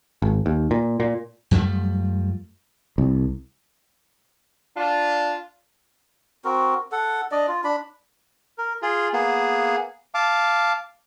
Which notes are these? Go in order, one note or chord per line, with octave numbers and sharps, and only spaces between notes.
G#1
D#2
A#2
A#2
F#2 F3 G3 A3
C2
D4 F4
C4 F#4 A#4
A4 F#5
D4 D5 D#5
F4
D4 B5
A#4
F4 G#4
A#3 B3 G#4
F5 A5 D6